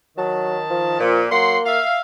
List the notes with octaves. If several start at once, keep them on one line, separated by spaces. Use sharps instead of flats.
D#3 F#3 A5
F3
A#2 F3
F#3 A#3 F#5 C6
E5 F5